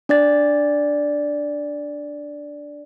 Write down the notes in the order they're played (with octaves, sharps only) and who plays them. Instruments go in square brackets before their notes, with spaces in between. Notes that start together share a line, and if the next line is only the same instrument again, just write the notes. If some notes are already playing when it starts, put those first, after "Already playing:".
[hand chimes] D4 D5 A6